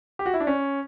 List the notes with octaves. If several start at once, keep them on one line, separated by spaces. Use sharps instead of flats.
G4
F#4
E4
D4
C#4